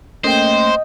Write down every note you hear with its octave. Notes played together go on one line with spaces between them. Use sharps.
A3 A#3 C#4 C5 D#5 G5